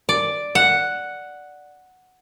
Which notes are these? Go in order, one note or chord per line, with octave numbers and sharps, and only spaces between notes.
D5
F#5